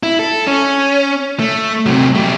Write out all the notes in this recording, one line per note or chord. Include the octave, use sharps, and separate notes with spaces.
E4
A4
C#4
A3
C3 F#3
A3 G4